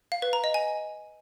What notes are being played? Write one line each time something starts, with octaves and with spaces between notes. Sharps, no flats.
F5
B4
A#5
D#5
G#5